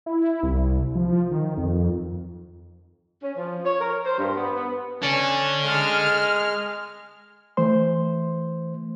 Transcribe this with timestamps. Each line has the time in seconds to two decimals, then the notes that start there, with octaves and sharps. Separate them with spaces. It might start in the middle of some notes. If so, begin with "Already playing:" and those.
0.06 E4
0.43 C2
0.95 F3
1.31 D#3
1.58 F2
3.23 C#4
3.37 F3
3.65 C#5
3.80 A#4
4.05 C5
4.18 G2
4.37 B3
4.56 B3
5.02 C#4 A4 D5
5.65 G#3 F6
7.57 E3 A3 C5 C6